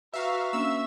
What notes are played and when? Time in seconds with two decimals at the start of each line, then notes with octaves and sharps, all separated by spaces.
0.14 F#4 B4 E5 F5 A#5 C#6
0.53 A#3 C#4 D4 E5 E6